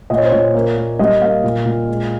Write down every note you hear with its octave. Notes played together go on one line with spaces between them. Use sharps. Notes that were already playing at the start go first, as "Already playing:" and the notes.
A#2 D#5
C#5
C5
A#2 C#5
A#3
A#3
G3 D#5
A#3 F5
A#2
A#2
G#3